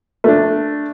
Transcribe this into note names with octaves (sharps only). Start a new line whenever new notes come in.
A3 D4